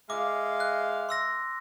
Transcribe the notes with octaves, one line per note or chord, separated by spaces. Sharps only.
G#3 E5 F5 D6
F#6
C6 E6 A#6